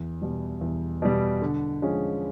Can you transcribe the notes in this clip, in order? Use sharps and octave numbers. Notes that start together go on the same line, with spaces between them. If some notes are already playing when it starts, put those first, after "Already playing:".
Already playing: E2
B2 G3
E2
B2 G3
D3
F3 G#3 C#4